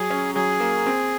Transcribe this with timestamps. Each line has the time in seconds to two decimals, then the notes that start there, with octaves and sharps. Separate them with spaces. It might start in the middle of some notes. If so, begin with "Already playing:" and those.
Already playing: F#3 G#4
0.10 C#4
0.35 F#3 G#4
0.60 A#3
0.86 C4